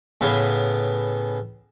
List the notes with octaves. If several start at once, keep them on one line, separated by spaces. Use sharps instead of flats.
A2 C#3 B3